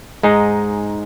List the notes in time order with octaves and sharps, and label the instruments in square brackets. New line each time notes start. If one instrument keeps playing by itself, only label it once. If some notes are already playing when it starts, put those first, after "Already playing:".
[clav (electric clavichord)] G#2 G#3 D#4 G#4